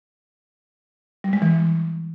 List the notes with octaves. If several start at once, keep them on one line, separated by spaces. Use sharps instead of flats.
G3
G#3
E3